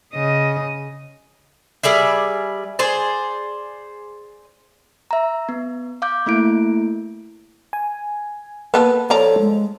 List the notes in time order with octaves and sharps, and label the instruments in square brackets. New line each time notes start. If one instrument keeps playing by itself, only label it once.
[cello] C#3 D#5
[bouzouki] G3 G#4 D5 E5
G#4 C5 D5
[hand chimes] E5 A#5
B3
F5 D6 G6
A3 A#3 E4 D7
[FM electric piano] G#5
[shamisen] A#3 B3 A4 [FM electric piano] B4
[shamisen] F3 D5 A#5 [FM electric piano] A4 [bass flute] C#5
[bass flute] G#3